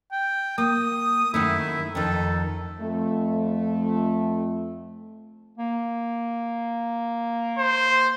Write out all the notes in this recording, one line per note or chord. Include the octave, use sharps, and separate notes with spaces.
G5
A#3 D#6
F#2 D#3 A3 E4
F2 D#3 A4
F2 A3
A#3
C5